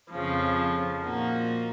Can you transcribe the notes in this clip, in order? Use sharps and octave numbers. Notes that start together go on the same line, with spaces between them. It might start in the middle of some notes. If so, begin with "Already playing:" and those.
F2 C#3 F3
A#2 F3 A#3 D#4 F#4